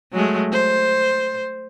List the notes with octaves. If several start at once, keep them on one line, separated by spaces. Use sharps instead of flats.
F#3 G#3 A3
C5